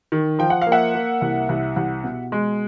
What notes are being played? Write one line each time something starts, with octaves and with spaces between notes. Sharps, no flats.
D#3
F3 G5
F#5
F5
A#3
E5 F#5
A#3
C2
C2
C2
B2
G#3